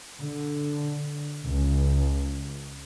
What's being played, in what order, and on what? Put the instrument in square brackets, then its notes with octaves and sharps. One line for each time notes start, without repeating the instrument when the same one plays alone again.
[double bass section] D3
C#2